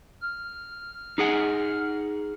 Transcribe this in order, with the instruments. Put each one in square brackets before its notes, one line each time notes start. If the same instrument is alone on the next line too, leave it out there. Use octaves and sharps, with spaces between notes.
[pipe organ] F6
[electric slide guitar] D#4 G#4 F#5